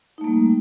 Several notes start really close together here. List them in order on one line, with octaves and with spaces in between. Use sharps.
D#4 A3 A#3 G3